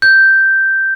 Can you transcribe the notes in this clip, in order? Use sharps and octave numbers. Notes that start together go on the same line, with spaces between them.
G6